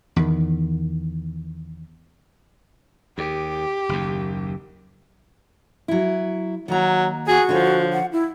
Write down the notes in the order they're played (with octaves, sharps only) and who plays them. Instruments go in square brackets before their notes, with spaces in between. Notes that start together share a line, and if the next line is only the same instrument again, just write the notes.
[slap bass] E2 D#3
[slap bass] D#2 [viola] G4
[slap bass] F#1 D#2
[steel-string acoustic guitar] F#3 E4
[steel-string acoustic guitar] D#3 A#3 A#5 [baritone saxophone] F#3
[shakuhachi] F#4 [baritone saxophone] G#4
[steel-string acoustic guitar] D3 C#5 [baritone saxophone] F3
[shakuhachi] F#5
E4